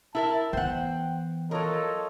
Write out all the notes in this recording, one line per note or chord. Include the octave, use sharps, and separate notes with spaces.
E4 A#4 E5 A5
E3 B3 C5 F#5 G5
F#3 F4 A4 A#4 C#5 D#5